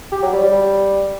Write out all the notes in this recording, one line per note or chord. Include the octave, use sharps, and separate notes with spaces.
G4
F#3
G3
G3